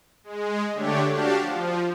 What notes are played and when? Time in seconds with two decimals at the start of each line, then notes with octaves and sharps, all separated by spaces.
0.24 G#3
0.74 D3 A3 D4 G4 C#5
1.11 D4 F#4 G4 F5 A5
1.41 F3